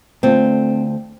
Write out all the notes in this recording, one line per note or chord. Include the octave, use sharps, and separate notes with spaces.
D2 A3 C4 F4